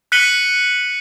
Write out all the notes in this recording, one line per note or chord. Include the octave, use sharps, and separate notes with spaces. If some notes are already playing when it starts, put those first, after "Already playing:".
F#6 B6 C#7 D#7 F#7 G7